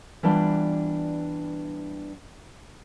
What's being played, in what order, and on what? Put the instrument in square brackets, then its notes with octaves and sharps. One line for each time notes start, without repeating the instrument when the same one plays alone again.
[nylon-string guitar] E3 G3 B3 D4 F4